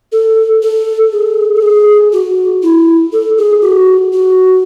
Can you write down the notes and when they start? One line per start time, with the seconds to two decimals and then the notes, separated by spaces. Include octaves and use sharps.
0.12 A4
0.62 A4
1.12 G#4
1.55 A4
1.62 G#4
2.12 F#4
2.63 E4
3.13 A4
3.38 G#4
3.62 F#4
4.13 F#4